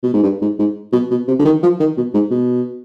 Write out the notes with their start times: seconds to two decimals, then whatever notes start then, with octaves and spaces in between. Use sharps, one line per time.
0.03 B2
0.14 G#2
0.23 G2
0.42 G#2
0.59 G#2
0.92 B2
1.11 B2
1.28 C3
1.39 D3
1.45 D#3
1.63 F3
1.80 D#3
1.97 B2
2.14 G#2
2.31 B2